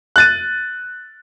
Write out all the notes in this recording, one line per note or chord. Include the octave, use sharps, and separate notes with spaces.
F#6 A6 D#7